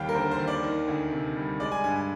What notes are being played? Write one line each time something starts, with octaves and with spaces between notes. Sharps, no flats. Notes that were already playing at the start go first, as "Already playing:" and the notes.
Already playing: D#2 G3 F5 G5
A#4
D3 C5
C5
D#2
D5
D#3
D2
C3
G3
G#3 D5
G#5
G2 G#5
G#5